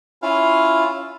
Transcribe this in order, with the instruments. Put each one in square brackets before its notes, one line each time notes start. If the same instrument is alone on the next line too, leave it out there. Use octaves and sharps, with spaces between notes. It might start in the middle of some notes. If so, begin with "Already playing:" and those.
[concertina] C#4 E4 F4 F5